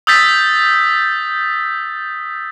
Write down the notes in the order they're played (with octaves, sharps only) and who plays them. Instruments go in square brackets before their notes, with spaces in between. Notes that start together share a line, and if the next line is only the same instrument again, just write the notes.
[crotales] D#6 E6 G6 A6 B6